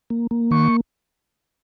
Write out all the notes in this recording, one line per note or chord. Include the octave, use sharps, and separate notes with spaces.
A#3
A#3
D#3 C#6